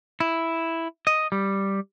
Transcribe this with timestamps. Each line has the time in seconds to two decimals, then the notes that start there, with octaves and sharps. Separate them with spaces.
0.20 E4
1.07 D#5
1.32 G3